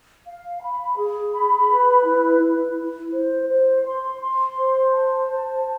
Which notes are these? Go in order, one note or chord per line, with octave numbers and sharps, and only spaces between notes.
F5
B5
G#4
B5
B4
E4
E4
E4
C5
C5
C6
C6
C5
A5
C5